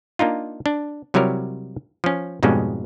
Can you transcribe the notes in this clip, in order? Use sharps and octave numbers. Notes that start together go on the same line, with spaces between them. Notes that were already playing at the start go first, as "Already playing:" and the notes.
A#3 D4 D#4 F4
D4
C3 F#3 G3 E4 A#4 C#5
F3 C#4
F2 G#2 B2 G3 G#3 C#4